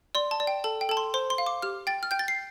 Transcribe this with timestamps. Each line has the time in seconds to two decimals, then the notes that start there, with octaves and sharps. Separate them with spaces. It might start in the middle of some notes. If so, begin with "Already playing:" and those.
0.15 D5 C6
0.31 A5
0.40 D5
0.47 G5
0.64 A4 A5
0.81 G5
0.89 A4 A5
0.97 C6
1.14 C5 C6
1.30 C6
1.38 F5
1.46 D6
1.62 G4 F6
1.87 G5 A6
2.03 F6
2.11 G5 G6
2.19 A6
2.28 C7